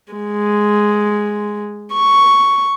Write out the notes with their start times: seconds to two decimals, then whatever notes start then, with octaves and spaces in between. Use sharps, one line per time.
0.12 G#3
1.93 C#6